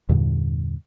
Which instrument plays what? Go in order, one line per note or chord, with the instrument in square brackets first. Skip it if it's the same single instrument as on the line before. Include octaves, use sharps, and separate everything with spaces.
[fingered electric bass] E2 G2 A#2 D3